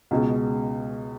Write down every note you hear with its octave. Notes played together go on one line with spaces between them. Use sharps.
C#2 B2 G#3